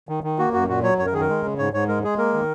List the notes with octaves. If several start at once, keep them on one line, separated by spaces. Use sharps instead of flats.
D#3
D#3
A#3 F#4
F#2 F#4
A#2 F#4
F#3 C#5
F#2 C#5
A#4
D#3 G#4
A#4
G#3
C#3
G#2 C#5
G#2 C#5
G#3 A#4
G#3 G#4
A#3 A#4
D#3